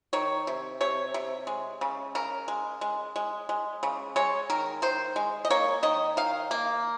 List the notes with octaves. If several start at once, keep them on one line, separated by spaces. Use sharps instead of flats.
D#3 C#5
C3
C3 C#5
C3
G#3
C#3
C#3 A#4
G#3
G#3
G#3
G#3
C#3
G#3 C#5
D#3 A#4
D#3 C5
G#3
D#5
A#3 C#5
D#3 D#5
D#3 F5
A#3